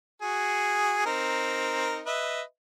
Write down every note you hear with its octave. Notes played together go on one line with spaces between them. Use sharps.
F#4 G#4
C4 D#4 A#4
B4 D#5 E5